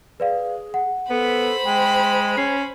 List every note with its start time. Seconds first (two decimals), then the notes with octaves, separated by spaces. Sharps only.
0.20 G#4 B4 D5 F5
0.74 F#5
1.11 B3 A4 C5 B5
1.65 G#3 G5
2.37 C#4 C7